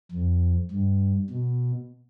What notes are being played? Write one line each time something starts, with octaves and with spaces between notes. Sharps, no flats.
F2
G2
B2